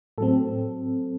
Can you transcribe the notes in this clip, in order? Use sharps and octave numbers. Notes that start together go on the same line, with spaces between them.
A2 F#3 C4 A4